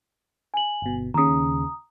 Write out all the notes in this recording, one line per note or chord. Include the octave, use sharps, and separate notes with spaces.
G#5 F#7
G1 B2
D#2 C#3 A#5 D#6